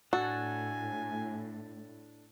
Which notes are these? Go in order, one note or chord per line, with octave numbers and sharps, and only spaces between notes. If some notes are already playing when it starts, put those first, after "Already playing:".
A2 D4 F#4 A4 G#5